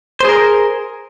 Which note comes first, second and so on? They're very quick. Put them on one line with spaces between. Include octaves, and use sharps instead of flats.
C5 G#4 A#4